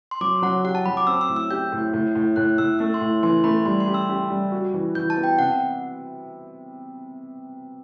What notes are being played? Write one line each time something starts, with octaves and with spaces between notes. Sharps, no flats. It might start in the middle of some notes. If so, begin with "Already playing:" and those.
C6
F#3 D6
F#3 F#5
G4 F#5
A5
F#3 B5
D6
C4 E6
E6
A2
E6
G4 G6
A2
A2
A2
A2 F#6
A2 E6
A3 E6
C6
A2
E3 C6
A3 B5
G3 C6
C6
G4
E6
G4
G3
F#4
E3
E3 G6
A5
B3
G5
C3 F#5